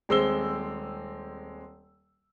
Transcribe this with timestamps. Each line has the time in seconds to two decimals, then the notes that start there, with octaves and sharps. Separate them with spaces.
0.09 D#1 G#3 C4 E6 G7